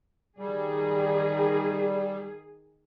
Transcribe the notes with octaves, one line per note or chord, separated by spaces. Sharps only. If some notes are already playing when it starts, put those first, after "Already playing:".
D#3 G3 G#4